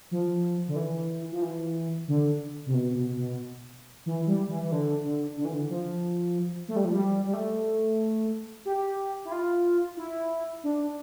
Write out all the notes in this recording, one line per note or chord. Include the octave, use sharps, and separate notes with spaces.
F3
D3
E3
F3
E3
D3
C3
B2
B2
B2
E3
G3
E3
E3
D3
D3
D3
E3
D3
F3
A3
G3
F3
G3
G3
A3
G4
E4
F4
E4
D4